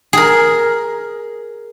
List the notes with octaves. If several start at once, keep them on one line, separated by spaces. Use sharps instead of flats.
G#4 A#4